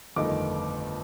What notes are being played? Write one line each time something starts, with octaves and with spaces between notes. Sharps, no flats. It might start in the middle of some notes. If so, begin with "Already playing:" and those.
G1 F2 D#3 A3 D#4 D6